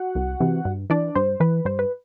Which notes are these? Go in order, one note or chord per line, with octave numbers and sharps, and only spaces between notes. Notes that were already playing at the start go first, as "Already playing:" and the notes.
Already playing: F#4 F#5
C2
C3 E3
G2
E3 D4 D5
G2 C5
E3 B4
G2 C5
B4